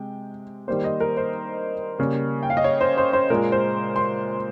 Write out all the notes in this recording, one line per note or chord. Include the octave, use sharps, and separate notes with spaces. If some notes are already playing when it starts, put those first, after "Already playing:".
Already playing: C3 G#3 G5
D#3 G3 A#3 C5
D#5
A#4
C5
C#3 G3 A#3
G5
F5
D#5
C#5
C5
C5
C5
A#2 G#3 A#4
C5
C6